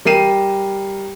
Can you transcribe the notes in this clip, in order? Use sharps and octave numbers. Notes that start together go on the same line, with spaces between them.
G3 A#4 G5 C7 D#7 E7